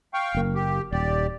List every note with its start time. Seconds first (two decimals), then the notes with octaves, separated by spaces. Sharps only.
0.14 F5 G5 C#6
0.35 F#1 A#3
0.55 G4
0.93 D#1 G4 D5